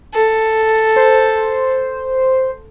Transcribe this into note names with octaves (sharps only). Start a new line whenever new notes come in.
A4
C5